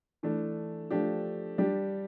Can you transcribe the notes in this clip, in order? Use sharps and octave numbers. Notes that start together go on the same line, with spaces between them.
E3 A3 D4
F3 A3 D4 G4
G3 D4 G4